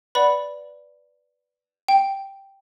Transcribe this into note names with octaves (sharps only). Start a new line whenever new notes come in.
B4 D5 F#5 B5
G5